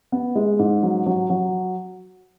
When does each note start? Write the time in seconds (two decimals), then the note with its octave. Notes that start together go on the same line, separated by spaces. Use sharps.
0.12 B3
0.36 G#3
0.59 G#2
0.83 F#3
1.06 F#3
1.30 F#3